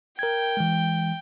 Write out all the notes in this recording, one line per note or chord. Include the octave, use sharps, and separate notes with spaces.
A#4 G5 G#6
E3 G#3